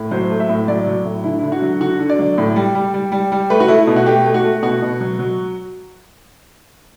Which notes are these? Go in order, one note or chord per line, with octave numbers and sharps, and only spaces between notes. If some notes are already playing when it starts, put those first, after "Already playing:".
Already playing: A2
F#3 C5
A3
E5
A2
F#3 D5
F#3
A2
D3 E4
E4
D3
F#4
F#3
D3 F#4
D3
D5
F#3
A2
G3
G3
G3
G3
G3
A3 B4
F#4
A3 E4
B2
F#4
A3 G4
A3
F#4
A3
B2 F#4
B2
F#3
F#3